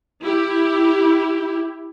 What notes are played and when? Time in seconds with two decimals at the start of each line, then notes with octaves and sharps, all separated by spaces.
0.23 E4 G4